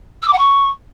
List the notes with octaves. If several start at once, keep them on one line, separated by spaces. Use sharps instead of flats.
E6
D6
F#5
C#6